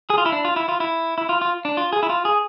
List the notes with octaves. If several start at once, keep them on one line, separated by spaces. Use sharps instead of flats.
G#4
F4
E4
D4
F4
E4
F4
E4
E4
F4
F4
D4
F4
G#4
E4
F4
G#4